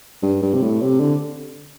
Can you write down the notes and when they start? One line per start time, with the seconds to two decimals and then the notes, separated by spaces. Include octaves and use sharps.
0.23 G2
0.42 G2
0.54 C3
0.63 A2
0.82 C3
1.00 D3